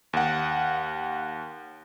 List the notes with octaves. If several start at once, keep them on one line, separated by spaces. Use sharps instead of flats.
D#2 F#5